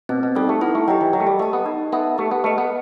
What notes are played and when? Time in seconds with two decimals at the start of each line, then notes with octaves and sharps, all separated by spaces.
0.09 B2 C4
0.23 B2
0.35 G3 D#4 A4
0.49 A3
0.61 B3 E4
0.75 A3
0.88 F#3 G4 D#5 G5
1.01 E3
1.13 F#3 G4
1.20 A3
1.27 G3
1.39 A3 D#5 A5
1.53 B3
1.66 D#4
1.92 B3 A4 E5 A5
2.18 A3 G4
2.31 B3
2.44 A3 B4 D#5
2.58 B3